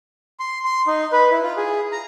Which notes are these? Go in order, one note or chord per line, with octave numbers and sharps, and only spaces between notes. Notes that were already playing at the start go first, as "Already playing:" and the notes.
C6
C6
D#4
B4
E4
F4
G#4
A#5